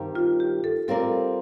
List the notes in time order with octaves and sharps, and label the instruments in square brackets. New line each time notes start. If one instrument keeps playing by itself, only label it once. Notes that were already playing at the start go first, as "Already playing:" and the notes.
Already playing: [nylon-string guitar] G2 D#3 G3 C4
[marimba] F4
G4
A4
[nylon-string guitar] G3 C4 F4 A#4 D5 [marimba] A4